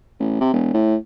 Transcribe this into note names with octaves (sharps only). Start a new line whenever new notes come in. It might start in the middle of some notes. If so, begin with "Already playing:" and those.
A1
C3
E1
A2